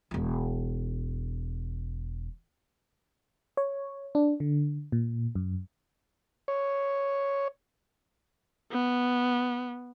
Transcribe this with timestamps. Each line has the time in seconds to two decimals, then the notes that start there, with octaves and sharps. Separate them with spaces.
0.11 E1 F4
3.57 C#5
4.15 D4
4.40 D3
4.92 A#2
5.35 F#2
6.48 C#5
8.72 B3